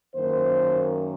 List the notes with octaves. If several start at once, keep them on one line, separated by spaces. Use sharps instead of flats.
F#2 D#3 A#3 C5